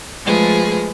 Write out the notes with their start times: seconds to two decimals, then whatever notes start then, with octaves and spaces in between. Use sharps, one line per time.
0.24 F3 G#3 A3 F4 G#4 B4